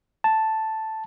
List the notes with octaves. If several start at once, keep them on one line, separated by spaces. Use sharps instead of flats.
A5